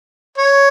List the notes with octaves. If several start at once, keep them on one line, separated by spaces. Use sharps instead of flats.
C#5